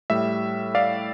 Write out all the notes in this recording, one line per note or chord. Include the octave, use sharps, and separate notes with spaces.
A2 G3 E5
D5 F5